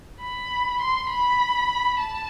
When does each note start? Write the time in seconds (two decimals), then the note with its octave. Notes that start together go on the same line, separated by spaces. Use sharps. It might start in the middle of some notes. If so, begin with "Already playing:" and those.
0.21 B5
0.81 C6
1.10 B5
2.00 A5